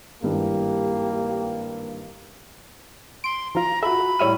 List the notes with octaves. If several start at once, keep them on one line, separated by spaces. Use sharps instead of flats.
G#1 G2 E3 A#3 G4
C6 D7
F3 F4 A#5
F4 F#4 A4 E5 B5
A2 G3 C#5 E5 F6 D#7